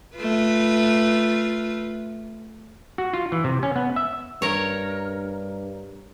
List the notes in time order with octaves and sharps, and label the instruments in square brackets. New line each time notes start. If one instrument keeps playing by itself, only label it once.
[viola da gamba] A3 F4 B4
[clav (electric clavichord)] F#4
F4
E3
C3
C#4
B3
E5
[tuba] G2 [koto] A#4 C#5